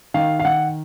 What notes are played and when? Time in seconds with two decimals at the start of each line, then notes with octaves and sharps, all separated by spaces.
0.14 D#3 F5
0.39 F5
0.45 D#3 F#5